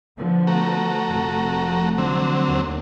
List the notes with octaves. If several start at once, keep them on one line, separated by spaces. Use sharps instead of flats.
D3 F3 B3
A3 F#4 A#5
F1 F3
D3 F#3 C4
D#2